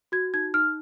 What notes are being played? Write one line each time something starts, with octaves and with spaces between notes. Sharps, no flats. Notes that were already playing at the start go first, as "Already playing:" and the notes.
F#4 G#6
D#4 G#6
D#4 F6